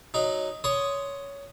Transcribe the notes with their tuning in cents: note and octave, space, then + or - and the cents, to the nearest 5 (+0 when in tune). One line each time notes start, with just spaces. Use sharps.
F#3 +0 D#4 +0
C#5 +15 C6 +0 D#6 +0